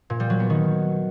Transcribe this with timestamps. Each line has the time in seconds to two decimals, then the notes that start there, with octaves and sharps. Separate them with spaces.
0.10 A#2
0.20 G3
0.30 F#3
0.40 B3
0.50 D#3